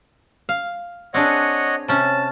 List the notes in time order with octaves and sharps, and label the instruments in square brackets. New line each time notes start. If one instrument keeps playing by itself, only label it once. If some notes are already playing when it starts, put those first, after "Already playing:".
[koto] F5
[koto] C4 D4 G#4 [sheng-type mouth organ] C#5 D#5 F#5
[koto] C3 C#4 [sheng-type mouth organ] A5